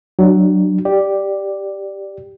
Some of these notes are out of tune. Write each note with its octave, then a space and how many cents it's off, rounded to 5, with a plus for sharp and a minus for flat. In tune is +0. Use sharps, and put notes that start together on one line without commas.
F#3 +15 D4 +20
G4 +0 D5 +0